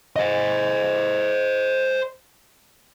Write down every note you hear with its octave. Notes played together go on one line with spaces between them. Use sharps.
C5 D#5